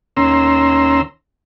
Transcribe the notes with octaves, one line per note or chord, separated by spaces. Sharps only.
D#2 C#4 A#5 C6 E6